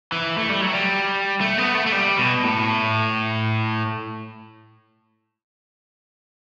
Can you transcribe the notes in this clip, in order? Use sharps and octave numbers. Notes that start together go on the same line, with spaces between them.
E3
A3
G3
F#3
G3
A3
B3
A3
A3
G3
B2
A2